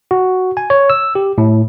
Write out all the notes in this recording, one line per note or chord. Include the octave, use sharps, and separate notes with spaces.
F#4
G#5
C#5
E6
G4
A2